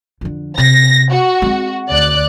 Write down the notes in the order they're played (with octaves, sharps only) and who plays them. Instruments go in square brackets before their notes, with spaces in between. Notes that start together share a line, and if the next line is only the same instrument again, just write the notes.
[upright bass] F2 D3
[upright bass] C3 [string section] A#6
[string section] F#4
[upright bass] G#3 C4
[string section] D2 D5 F#6